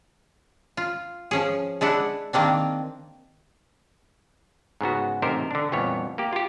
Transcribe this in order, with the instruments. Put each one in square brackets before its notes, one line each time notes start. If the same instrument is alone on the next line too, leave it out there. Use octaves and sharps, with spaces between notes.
[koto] F4
F3 C#4 G#4
G#3 D4 E4 F#5
D#3 A#3 C4 D4
[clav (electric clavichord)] G#2 C#3 B3 F#4
A1 C3 D#4 A#4 C5
D3 D4
A#1 F2 E3 G3 B3 C#5
A#3 G4
F4 G4